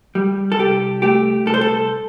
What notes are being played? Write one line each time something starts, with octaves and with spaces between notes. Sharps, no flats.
G3
A4
C2 G4
A3 G4
C2 A4
C5
A4